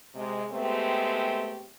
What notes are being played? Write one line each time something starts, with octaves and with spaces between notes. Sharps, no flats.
C3 G#3
G#3 A3 B3 C4 G4